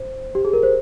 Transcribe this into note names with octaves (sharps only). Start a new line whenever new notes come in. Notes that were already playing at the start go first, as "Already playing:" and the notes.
Already playing: C5
G4
G#4
A#4
C5